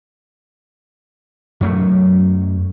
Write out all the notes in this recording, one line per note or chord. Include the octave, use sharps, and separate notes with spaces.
F#2 F#3 A3